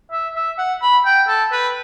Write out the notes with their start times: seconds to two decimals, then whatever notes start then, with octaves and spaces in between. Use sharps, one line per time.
0.12 E5
0.35 E5
0.58 F#5
0.82 B5
1.05 G5
1.28 A4
1.52 B4